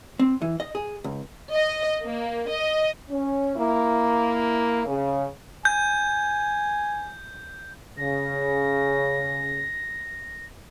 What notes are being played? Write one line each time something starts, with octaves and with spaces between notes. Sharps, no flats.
C4
E3
D#5
G#4
C#2
D#5
A#3
D#5
C#4
A#3 E4
C#3
G#5 G6
C#3 A#6